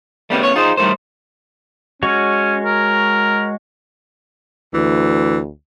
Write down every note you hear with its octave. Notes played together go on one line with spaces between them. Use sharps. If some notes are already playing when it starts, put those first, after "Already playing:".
D#3 G3 A3 B3 C#4
C#5
D#4 F4 G#4 C5
A2 D#3 G3 A3 C5
G#3 C#4 F#4 C#5
A#4
D2 E3